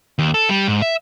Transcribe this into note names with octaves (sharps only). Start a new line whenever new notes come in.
D#2
A4
G3
G#2
E5